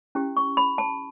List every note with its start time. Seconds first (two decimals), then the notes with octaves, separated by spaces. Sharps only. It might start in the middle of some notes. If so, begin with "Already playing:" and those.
0.15 C#4 E4 G4
0.37 C#6
0.57 B5
0.78 A5